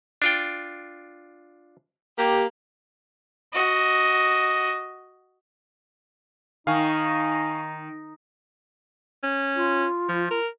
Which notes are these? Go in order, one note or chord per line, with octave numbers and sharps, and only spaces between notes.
D4 F4 G5
A#3 G4
F#4 D#5
D#3 D#4 F5 G#5 C#6
C#4
F4
F3
A#4